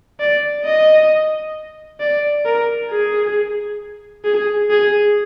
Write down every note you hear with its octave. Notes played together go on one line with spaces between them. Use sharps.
D5
D#5
D5
A#4
G#4
G#4
G#4